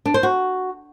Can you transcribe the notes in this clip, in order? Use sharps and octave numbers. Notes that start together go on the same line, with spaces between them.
D4
C5
F#4